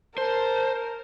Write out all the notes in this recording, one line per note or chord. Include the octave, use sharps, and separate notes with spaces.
A#4 C5 A5